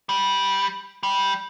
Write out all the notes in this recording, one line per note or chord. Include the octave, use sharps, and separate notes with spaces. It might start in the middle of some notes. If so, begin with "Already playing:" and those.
G3
G3